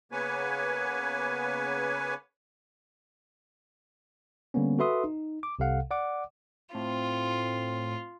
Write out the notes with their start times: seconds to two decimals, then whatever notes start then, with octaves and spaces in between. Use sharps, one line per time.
0.12 C#3 A#3 B3 B4 C#5 G#5
4.54 D3 G3 A#3 B3 C#4
4.79 F#4 A4 B4 E5 C6 D#6
5.04 D#4
5.43 D6
5.59 C2 C3 A4 F5 F#5
5.91 D5 F#5 D6
6.74 A2 C4 F4